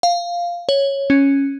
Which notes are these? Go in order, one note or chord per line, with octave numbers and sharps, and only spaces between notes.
F5
C#5
C#4